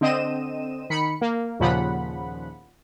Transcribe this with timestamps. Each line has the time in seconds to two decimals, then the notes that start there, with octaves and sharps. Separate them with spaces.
0.01 D3 C4 D#5 D#7 E7
0.90 D#3 B5 C#7
1.21 A#3
1.60 D#2 A#2 C#3 F3 F#5 B5